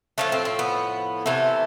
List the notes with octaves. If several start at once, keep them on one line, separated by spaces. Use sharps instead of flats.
A2 F3 A3 D4
C4
C4
B3
C3 E3 A3